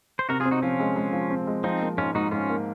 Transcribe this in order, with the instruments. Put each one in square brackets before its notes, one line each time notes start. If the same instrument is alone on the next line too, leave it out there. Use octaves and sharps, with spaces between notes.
[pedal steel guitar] C5
[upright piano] C3 [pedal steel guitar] F#4 A#4
[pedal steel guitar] F4 G#4
[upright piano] C4
[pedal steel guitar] D#4 F#4
[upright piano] F3 [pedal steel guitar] C#4 F4
[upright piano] G#3
G#3
F3
C4
G#3
[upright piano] F3 [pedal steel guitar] C4 D#4
[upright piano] A#3
[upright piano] G#2 [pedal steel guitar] C#4 F4
[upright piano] G#2 [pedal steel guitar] D#4 F#4
[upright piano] G#2 [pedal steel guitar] C#4 F4
[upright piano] A#3